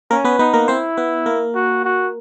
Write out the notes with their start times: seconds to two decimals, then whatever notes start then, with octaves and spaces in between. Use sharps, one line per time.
0.11 A#3 C#4 A#4
0.25 B3 B4
0.39 B3 D#4 B4
0.53 A#3 A#4
0.68 C4 E4 C5
0.97 B3 B4
1.26 A#3 A#4
1.55 F#4
1.84 F#4